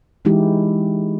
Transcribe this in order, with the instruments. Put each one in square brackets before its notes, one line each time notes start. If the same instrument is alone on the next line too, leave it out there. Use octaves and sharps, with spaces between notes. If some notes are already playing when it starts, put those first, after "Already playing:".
[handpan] E3 G#3 D#4 E4 G4